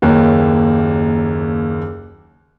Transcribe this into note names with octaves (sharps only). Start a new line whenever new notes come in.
F#1 D#2 A#3 C#5 F#6